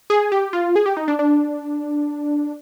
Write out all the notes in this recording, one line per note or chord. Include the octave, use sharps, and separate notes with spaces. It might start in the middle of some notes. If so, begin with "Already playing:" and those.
G#4
G4
F4
G#4
G4
D#4
D4
D4